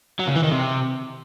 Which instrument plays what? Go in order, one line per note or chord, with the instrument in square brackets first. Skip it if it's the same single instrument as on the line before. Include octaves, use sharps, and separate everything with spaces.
[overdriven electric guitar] F#3
C#3
E3
D#3
C3